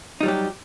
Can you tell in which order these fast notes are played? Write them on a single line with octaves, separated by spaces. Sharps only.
D#4 G3 F#3 G4